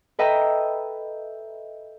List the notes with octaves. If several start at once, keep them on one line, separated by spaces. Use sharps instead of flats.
A4 B4 D#5 E5 G5 A#5